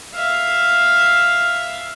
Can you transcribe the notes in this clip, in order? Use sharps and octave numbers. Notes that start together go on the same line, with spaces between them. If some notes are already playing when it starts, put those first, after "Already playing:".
E5 F5